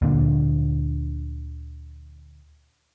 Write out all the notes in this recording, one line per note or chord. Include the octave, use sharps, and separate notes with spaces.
D2 A#2 D3